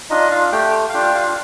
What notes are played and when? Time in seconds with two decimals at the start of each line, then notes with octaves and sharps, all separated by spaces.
0.10 D4 D#4 F4 D#5
0.31 F4 F5
0.52 A3 G4 G5
0.89 F5
0.94 D4 F4 G4 G5
1.15 F4 F5